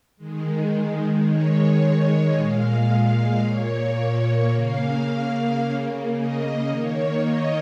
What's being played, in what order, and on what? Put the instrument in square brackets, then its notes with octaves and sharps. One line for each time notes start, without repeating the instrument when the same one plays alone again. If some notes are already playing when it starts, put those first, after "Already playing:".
[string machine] D#3 G#3
D#3 G#3 C#5
A#2 G#3 F5
A#2 A#3 C#5
C#3 A#3 F5
C#3 A#3
D#5
D#3 A#3 C#5
D#5